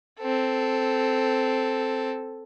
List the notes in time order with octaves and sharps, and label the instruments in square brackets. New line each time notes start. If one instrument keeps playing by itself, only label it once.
[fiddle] C4 A4